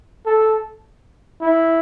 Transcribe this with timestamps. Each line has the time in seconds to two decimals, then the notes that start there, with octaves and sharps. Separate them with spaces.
0.27 A4
1.41 E4